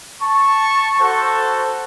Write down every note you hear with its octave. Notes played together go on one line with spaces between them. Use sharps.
A5 C#6
F#4 A4 C5 F#5